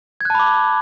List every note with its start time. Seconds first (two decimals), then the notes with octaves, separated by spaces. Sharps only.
0.21 G#6
0.25 F#6
0.30 A5
0.35 B5
0.39 D6